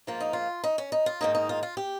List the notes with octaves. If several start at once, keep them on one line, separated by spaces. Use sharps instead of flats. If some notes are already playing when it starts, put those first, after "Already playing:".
G#2 F3 A#3 F4
D#4
F4
D#4
C#4
D#4
F4
G#2 D#3 A#3 D#4
D#4
F4
F4
G4